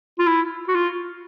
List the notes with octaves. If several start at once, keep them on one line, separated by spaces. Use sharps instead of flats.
F4
E4
F#4
F4